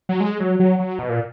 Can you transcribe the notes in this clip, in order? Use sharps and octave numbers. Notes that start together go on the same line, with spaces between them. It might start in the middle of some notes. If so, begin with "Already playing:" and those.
F#3
G#3
F#3
F#3
F#3
B2
A#2